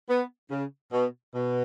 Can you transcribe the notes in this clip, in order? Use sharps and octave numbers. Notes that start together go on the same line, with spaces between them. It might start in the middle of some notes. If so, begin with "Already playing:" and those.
B3
C#3
B2
B2